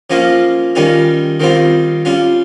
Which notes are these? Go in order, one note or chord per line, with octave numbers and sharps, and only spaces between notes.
F3 A#3 C#4 F4
D#3 G3 C#4 F4
D#3 G3 C4 F4
G3 C#4 F4